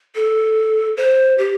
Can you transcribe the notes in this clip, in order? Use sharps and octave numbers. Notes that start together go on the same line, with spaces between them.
A4
C5
G4